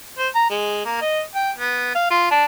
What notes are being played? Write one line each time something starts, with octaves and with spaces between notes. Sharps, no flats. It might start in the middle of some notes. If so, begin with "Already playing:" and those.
C5
A#5
G#3
A#3
D#5
G5
B3
F5
F4
D4